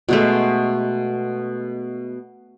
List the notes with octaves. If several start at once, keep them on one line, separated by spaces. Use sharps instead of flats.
B2 G#3 A3